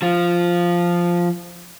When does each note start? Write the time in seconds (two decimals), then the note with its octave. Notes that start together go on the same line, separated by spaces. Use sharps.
0.02 F3 F4